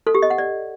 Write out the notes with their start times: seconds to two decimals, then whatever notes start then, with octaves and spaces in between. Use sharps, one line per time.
0.07 A4
0.15 G4
0.22 D#5
0.30 F#5
0.38 D5